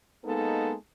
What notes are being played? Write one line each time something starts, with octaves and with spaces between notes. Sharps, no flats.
G#3 A#3 B3 D#4 A4